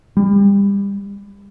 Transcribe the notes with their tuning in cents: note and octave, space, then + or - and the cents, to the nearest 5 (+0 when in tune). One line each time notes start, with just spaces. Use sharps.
G3 +30